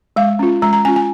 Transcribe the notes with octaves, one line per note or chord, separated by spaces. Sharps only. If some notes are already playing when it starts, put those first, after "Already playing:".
G#3 F5
C#4 F4
G#3 A#5
A#5
C#4 F4 G#5
G#5